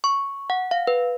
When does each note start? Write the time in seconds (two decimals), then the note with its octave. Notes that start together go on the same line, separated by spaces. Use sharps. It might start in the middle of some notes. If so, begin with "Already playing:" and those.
0.04 C#6
0.50 F#5
0.71 F5
0.87 B4